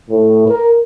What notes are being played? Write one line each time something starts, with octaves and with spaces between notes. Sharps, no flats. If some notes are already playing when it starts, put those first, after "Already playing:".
A2
A#4